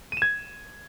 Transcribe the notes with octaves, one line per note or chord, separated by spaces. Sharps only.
G#6 D#7 E7